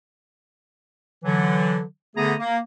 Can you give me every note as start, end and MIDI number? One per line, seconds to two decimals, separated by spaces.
1.24 1.81 50
1.24 1.81 52
1.24 1.81 54
2.15 2.33 50
2.15 2.33 57
2.15 2.33 59
2.15 2.33 68
2.15 2.33 82
2.15 2.33 87
2.39 2.57 58